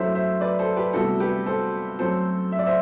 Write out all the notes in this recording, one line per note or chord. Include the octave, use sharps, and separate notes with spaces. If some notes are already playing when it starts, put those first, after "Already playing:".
Already playing: F#2 F#3 A3 E4 C5 E5
C5 E5
B4 D5
A4 C5
G4 B4
D2 C3 G3 B3 E4 F#4 A4
G4 B4
A4 C5
F#2 F#3 A3 C4 A4 C5
E5
D5
C5 E5